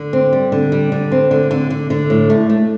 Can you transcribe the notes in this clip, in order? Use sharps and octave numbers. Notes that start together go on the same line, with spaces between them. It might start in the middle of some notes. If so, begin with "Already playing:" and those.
Already playing: D3
C4
G3
D3
G3
D3
C4
D3
D3
D3
D3
A2
A3
A3